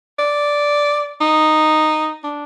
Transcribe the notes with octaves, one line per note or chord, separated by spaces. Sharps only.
D5
D#4
D4